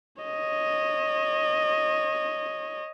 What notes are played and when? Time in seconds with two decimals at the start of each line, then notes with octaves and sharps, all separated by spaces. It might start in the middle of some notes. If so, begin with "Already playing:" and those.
0.22 C#5 D#5